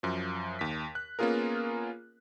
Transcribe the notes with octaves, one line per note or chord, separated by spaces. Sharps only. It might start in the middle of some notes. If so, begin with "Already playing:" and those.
F#2 F3
D#2 B6
F#6
A#3 B3 C#4 F4 G#4 A#4